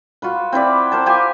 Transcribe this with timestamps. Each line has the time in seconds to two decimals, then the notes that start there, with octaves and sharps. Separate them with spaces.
0.22 F4 F#4 B4
0.52 C4 E4 B4 D5
0.92 A#4 C5 A5
1.06 F4 G4 B4 G#5